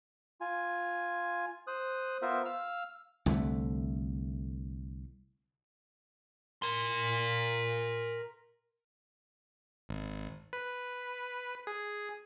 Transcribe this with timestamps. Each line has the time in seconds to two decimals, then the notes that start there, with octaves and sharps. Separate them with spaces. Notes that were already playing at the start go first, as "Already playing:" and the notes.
0.41 F4 G#5
1.67 C5 D#6 F#6
2.22 B3 F4 A#4 C5 E5
2.45 F5 E6 F6
3.26 C2 D3 A3
6.62 A#4 C6
9.89 G#1
10.53 B4
11.67 G#4